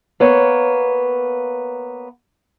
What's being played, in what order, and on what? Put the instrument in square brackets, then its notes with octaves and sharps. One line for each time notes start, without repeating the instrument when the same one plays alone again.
[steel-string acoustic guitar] A#3 B3 C#5